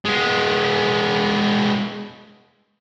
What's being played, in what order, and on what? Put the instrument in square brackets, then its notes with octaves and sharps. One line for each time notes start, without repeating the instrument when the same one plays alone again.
[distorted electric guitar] G#3 B3